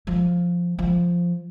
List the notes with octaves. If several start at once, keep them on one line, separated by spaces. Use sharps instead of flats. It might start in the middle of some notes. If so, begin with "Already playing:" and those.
F3
F3